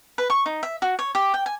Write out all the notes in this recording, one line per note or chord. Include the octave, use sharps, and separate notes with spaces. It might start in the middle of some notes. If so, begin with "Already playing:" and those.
B4
C#6
D#4
E5
F#4
C#5
G4
G5
G#5